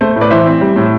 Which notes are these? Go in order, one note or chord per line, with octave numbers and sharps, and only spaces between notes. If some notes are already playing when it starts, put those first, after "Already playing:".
A3 C5
A2
B4 D5
E3 C5 E5
C4
G3
A2